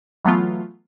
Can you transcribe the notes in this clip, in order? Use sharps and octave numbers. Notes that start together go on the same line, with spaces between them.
E3 F#3 A3 B3 F4